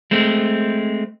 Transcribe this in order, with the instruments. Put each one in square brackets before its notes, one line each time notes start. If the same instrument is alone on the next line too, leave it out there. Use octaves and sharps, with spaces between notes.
[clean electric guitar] G#3 A3 C4